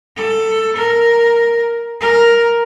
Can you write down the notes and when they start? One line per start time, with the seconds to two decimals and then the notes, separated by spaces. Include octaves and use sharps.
0.17 A4
0.77 A#4
2.01 A#4